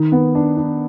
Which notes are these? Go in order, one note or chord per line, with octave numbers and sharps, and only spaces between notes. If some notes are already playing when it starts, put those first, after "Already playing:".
Already playing: D#3
B3
D4
D4